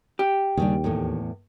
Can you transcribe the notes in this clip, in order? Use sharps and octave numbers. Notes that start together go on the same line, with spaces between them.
G4
D#2 C#3 G3 D4
E2 A2 A3